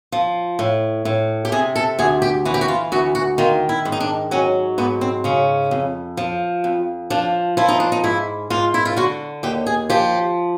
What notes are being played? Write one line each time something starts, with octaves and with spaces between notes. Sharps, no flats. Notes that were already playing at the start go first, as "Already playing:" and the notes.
F3
A2
A2
G4
C3 G#4
A4
D2 G#4
G4
E3 F#4
G4
F#4
F4
D2 F#4
F#4
D#3 F4
E4
G#2
D#4
D4
F#3 C#4
G#2 B3
C4
C#3 C#4
F2
F3
F2
F3 D4
F3 E4
D#4
D4
D#4
G#2 E4
G#2 F4
E4
F4
D3 F#4
D#2 G4
G#4
F3 G4